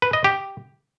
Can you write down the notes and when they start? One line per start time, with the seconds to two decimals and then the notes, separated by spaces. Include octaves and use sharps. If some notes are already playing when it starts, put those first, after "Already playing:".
0.02 B4
0.13 D#5
0.24 G4